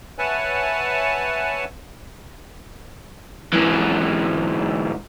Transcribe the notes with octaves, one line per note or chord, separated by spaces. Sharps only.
B4 C#5 E5 F#5 G#5 A5
G#2 E3